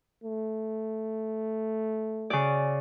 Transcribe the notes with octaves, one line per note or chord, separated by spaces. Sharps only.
A3
C#3 D5